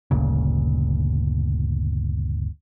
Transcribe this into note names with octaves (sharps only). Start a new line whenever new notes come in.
G1 D2 A#2 C#3